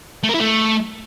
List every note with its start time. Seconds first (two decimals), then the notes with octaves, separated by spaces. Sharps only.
0.23 A3
0.29 A#4
0.35 E4
0.40 A3